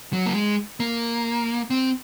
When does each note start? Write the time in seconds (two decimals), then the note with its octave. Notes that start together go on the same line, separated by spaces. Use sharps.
0.13 F#3
0.26 A#3
0.35 G#3
0.80 A#3
1.70 C4